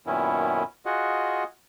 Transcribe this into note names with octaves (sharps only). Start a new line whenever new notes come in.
F#2 A#2 D#3 B3 C#4 E4
F4 F#4 G#4 D#5 F#5